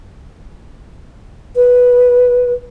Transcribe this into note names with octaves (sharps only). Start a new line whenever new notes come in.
B4